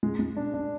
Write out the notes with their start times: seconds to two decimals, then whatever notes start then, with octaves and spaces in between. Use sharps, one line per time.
0.03 G#3
0.19 G#3
0.37 D4
0.54 D4